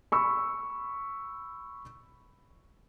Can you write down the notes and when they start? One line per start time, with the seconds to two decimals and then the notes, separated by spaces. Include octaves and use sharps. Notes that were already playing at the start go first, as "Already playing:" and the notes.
0.12 B5 C#6 E6